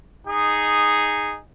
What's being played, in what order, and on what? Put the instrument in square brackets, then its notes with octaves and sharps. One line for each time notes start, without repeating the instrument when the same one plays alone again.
[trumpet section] D#4 G#4